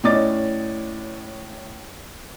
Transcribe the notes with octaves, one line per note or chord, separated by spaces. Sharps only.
A2 C#4 D5 D#5 D6 A6